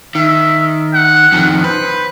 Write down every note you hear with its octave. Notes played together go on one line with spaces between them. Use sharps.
D#3 E5
F#5
F2 D#3
B4 C5